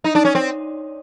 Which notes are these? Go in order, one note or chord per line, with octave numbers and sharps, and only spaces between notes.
D#4
D4
C#4
C4